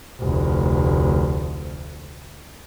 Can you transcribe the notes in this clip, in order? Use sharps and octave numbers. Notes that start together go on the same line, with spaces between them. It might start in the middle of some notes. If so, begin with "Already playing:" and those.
F1 D2